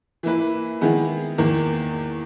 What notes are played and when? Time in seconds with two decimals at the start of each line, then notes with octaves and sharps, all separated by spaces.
0.23 E3 A#3 E4 B4
0.81 D#3 G#3 B3 E4 G#4
1.38 E2 D#3 A#3